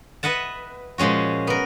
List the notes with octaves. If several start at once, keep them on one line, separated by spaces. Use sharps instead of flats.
B4 D#5 E5 F#5 A5
A#2 F3 G#3 C#4 F#4
B3 A#4